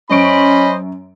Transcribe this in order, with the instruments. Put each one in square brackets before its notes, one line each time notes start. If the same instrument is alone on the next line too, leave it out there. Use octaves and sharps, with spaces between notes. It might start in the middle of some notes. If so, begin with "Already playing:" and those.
[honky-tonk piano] F#2 C#6 D7 [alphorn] C#4 [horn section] C5 B5 [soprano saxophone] D#5